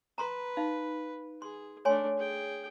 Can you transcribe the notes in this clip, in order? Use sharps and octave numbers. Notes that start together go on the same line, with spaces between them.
B4 A#5 C6
D#4 F5
G#4 C6
A3 D4 C#5 G#5 C6
G#4 G5